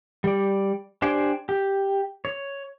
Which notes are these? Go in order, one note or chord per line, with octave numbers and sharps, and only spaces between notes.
G3 D5
D4 G4 C5 D5 G#5
G4
C#5